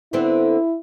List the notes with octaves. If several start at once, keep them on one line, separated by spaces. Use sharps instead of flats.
D3 B3 C4 E4